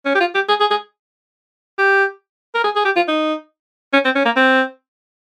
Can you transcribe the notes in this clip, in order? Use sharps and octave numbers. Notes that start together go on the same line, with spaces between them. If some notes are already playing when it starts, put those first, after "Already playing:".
C#4
G4
F4
G4
G#4
G#4
G#4
G4
A#4
G#4
G#4
G4
F4
D#4
C#4
C4
C#4
A#3
C4